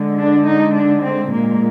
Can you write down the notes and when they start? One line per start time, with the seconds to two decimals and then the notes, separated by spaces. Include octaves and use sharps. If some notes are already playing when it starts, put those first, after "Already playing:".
Already playing: D3 G#3
0.17 D4
0.45 D#4
0.74 D4
1.03 C4
1.32 A#2 G#3 A#3